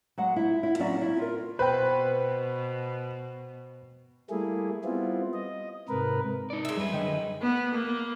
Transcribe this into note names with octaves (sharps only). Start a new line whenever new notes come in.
F#3 G#3 F#5
E4
E4
F#3 A#3 C4 C#4 D5
E4
F4 A#4
B2 B4 C5 G5
G3 A3 A#3 E4 G#4
G3 B3 C4 E4 F4
D#5
G#2 C3 A#4 B4
D#4 D5
G#3 E5
F#2 G3 B4
D3 D#4 G5 G#5
D#3
B3
A#3